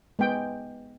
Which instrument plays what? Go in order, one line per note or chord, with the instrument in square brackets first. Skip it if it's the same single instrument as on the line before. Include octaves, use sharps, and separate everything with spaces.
[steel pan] G#3 B3 G5